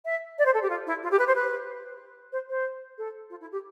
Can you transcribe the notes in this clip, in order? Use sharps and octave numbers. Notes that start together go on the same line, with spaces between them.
E5
D5
C5
A4
G4
F4
E4
F4
G4
B4
C5
B4
C5
C5
A4
F4
E4
G4